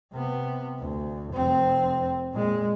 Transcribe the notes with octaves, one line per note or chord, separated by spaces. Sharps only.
C3 B3
D2
F1 C4
A#2 G#3